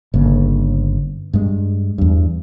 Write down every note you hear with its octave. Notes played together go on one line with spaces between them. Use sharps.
G1 C#3 A#3
G2 G#3
E2 G2